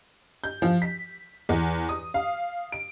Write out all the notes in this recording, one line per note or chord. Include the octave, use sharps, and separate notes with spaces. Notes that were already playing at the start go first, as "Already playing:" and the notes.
G6
F3
B6
E2
D#6
F5
D7